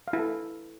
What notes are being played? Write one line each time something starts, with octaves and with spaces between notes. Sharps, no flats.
F5
E4
A4